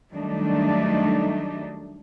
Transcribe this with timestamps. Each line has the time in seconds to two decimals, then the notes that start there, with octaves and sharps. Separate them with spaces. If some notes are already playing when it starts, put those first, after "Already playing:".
0.13 D#3 F#3 G3 A3 D4 D#4